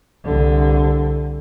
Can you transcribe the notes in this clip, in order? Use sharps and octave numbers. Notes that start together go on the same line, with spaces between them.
C2 D3